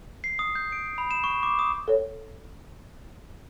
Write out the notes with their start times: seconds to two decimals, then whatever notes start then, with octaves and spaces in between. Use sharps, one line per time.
0.24 C7
0.39 D#6
0.55 G6
0.72 D7
0.98 B5
1.11 E7
1.24 C#6
1.43 D6
1.59 D#6
1.88 A4 C#5